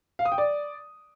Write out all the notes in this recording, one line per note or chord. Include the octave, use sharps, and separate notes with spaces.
F5
D#6
G5
D5